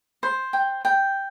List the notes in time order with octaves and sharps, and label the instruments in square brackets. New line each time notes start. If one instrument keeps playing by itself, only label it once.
[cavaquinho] C5
G5
G5